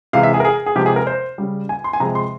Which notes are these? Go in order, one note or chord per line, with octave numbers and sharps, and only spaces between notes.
C3 E3 G#3 F5
E5
G#4
A#4
G#4
G#4
C3 F3 G#3 G4
G#4
A#4
C5
C#3 G3
G#5
C6
G#5
C3 F3 G#3 A#5
C6